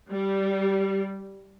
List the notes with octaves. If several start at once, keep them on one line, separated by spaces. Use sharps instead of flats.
G3